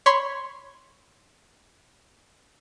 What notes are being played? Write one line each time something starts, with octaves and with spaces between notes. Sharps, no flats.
C#5 B5 C6 C7